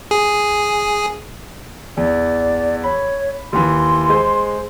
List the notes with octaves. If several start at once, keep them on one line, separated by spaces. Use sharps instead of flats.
G#4
E2 D5
C#5 B5
D#2 E3 C6
G#3 C5